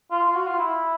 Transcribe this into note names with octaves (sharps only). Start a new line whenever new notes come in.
F4
F4
F#4
F4
E4